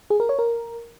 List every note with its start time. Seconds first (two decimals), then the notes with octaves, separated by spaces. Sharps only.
0.10 G#4
0.20 A#4
0.29 C#5
0.39 A#4